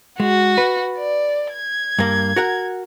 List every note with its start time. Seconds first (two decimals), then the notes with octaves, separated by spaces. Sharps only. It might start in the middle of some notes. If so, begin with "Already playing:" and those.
0.20 G#3 F#4
0.58 B4
0.97 D5
1.53 G#6
1.99 G2 A#3
2.36 F#4 A#4 F#5